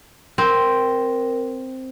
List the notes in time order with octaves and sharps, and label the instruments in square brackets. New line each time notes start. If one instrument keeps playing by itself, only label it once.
[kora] C4 [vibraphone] A#4